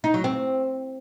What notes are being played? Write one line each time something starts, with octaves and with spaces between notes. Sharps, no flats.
D#4
F#3
C4